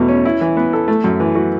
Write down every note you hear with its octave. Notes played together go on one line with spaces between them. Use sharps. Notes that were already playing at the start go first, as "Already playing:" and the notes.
Already playing: E2 B2 A3
C#4
E4
E3
B3
A4
A3
F#2
E3
F#4